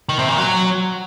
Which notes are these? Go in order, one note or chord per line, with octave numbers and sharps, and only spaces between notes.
D#3
C3
A#2
F#3